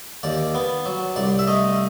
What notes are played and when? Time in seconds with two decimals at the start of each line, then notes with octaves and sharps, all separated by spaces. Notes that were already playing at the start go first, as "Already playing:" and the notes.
0.23 D#2 D5
0.55 B3
0.86 F#3
1.16 C2 D5
1.39 E5
1.47 A3 D#5